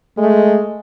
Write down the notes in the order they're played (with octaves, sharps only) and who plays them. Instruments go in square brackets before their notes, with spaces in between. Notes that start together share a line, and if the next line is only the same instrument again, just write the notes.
[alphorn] G#3 [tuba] A3